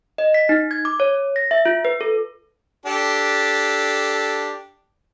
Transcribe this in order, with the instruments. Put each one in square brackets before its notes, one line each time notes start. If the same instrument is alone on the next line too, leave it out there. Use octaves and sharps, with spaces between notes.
[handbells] D#5
B6
D#4
G#6
D6
C#5
A#6
E5
F4
B4
A4
[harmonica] D4 G4 A4